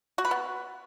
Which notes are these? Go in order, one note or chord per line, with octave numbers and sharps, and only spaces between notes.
F#4
B4
B3